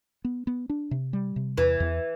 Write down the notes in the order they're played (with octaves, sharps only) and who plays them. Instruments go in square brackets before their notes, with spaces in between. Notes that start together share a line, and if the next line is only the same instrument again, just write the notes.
[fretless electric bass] B3
B3
D4
C3
G3
C3
[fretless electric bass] E2 [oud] E3
[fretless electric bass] E2